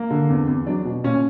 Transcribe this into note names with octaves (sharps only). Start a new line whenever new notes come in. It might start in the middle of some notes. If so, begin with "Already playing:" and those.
Already playing: A#3
D3
E2
E2
F#3 D4
B2
A#2 C#4